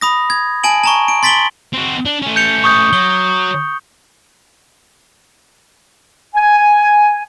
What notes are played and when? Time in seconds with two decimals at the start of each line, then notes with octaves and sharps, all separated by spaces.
0.01 B5 D#6 A#6
0.30 G#6
0.64 G#5 A5 D7 F#7
0.84 A5 A#5 C#6
1.08 D7
1.23 C6 A6 B6 D7 F#7 G7
1.73 C4 F#4
2.05 D4
2.22 A3 C#4
2.36 G6 C#7 F7
2.64 C#6 D#6 G6
2.93 F#3 G7
6.35 G#5